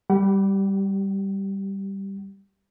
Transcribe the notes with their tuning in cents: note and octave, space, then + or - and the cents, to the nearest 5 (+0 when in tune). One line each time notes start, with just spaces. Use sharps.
G3 +0 G4 -20 F#5 +40